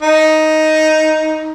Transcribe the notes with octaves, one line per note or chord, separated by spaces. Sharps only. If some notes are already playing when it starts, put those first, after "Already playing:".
D#4